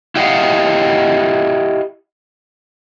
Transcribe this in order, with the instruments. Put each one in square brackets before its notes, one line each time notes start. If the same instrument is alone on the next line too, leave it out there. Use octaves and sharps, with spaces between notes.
[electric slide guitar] E4 G4 D#5 F5 F#5